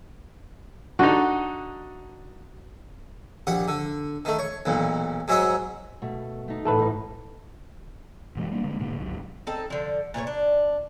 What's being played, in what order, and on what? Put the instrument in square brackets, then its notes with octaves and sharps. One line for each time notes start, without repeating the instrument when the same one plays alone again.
[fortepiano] D3 D4 D#4 [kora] F#4
[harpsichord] A#1 G4 F#5
D3
D#3 A3
C#5
B1 E2 A#2
G#2 F#3 G#3 E5 F#5 C6
[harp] B2 A3
A3 D#4
[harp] E1 A2 [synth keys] A3 A4 B4
[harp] G#2 D#4
[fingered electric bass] F#1 B2 E3 G#3
G3 A#3 B3 D4
D3 G#3 A#3
G#2 B2 D3 A#3
G#1 D2 F#3
[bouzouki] C4 D#4 A4
D3 F3
A#2 A3 G4 C#5
D4